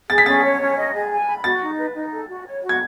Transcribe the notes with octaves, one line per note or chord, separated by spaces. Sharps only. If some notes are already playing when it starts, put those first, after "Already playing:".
G#4 A6
B6
C#4 A6
C#5
C#4
D#5
G#4
G#5
B5
F#4 A6
D#4
B4
D#4
A4
F#4
C#5
F#4
G#6